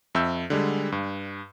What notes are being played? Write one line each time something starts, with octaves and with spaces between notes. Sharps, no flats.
F2 E5 E6 G6
D3 G3 G#3
G2